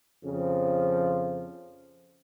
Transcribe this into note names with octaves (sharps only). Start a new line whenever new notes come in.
F2 C#3 F3